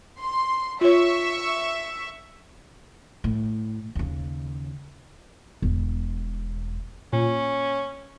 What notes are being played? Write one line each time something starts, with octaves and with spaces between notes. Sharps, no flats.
C6
F4 C#5 E5 C#6
A2
D#2 C#3
E1
A#2 C#4